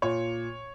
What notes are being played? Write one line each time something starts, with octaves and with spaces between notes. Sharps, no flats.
A#2 C#5